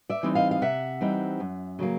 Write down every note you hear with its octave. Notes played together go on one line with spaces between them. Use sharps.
D5 E5
E3 G3 C4 D#4
D#5 F5
F5
C3 E5 F#5
E3 G3 C4 D#4
F#2
C#3 F#3 A#3